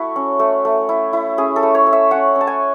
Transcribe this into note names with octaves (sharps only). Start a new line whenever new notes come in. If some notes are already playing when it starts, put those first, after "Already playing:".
Already playing: A3 E4 F#4
C#4
A3
A3
E4
E4
C#4 G#4
A4
A3
C#5
A3
E5
C#4 F#5
C#4
A5
G#5